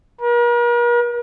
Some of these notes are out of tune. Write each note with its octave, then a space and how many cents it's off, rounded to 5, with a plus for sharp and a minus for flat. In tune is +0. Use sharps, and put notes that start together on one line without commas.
A#4 +45